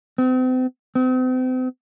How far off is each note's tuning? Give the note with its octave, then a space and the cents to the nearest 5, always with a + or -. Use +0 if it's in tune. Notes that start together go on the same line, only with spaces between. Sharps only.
C4 -40
C4 -40